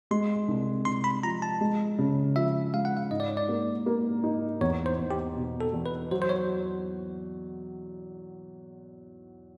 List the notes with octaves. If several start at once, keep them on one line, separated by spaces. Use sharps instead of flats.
G#3 C6
C2
C2 C6
B5
F3 A#5
A5
G#3
C#3
F3 E5
G#3 F5
F#5
F5
G#2 D#5
D5
C#5
D5
A#3
A#3
D#4
E2 C#5
C5
E2
G4
B2
A4
E2
B4
F#3 C5
C5
C#5